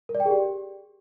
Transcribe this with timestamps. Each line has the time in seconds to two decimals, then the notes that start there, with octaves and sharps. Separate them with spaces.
0.09 A#4
0.15 D5
0.20 G5
0.25 G#4
0.31 G4